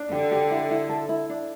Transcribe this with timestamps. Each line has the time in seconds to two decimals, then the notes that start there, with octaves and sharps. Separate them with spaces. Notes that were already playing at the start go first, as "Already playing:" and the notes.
Already playing: D4
0.11 D3 G4
0.31 G4
0.51 E4
0.71 E4
0.89 A4
1.09 E4
1.30 D4